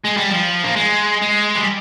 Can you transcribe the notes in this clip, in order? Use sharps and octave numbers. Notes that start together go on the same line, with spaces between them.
G#3
G3
F3
A#3
G#3
G#3
G3